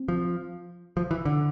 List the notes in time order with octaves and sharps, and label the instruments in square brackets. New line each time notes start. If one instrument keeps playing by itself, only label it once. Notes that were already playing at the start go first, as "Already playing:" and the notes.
Already playing: [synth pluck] C4
[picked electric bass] F3
F3
E3
D3